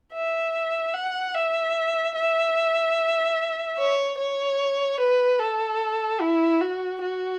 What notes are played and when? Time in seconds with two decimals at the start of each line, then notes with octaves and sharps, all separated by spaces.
0.13 E5
0.94 F#5
1.35 E5
2.16 E5
3.78 C#5
4.18 C#5
5.00 B4
5.40 A4
6.21 E4
6.61 F#4
7.01 F#4